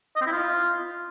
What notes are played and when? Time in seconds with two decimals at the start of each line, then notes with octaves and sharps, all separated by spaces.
0.16 D#5
0.21 C4
0.26 E4
0.32 F4